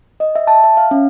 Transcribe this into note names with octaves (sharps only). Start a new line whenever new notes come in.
D#5
E5
A5
E5
F5
C#4